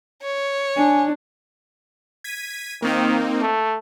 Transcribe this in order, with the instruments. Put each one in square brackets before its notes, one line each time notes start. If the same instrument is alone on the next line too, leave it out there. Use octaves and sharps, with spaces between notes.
[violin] C#5
[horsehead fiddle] D4 [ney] G#5
[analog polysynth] G#6 B6 D#7
[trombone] D#3 [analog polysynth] A#3 C4 D#4
[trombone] A3